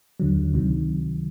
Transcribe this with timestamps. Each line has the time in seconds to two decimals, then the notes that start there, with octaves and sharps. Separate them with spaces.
0.20 D#2 D3 F#3
0.53 C#2 C3 D#3 F#3